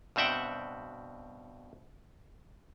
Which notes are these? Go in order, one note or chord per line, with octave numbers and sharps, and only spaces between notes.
G2 B2 C4 E5 F#5 G5